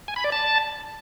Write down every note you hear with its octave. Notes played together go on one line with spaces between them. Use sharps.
G#5
B5
D5
A5